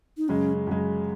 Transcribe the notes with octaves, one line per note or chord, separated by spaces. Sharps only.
D#4
F#2 C#3 G#3 C#4
F#2 C#3 G#3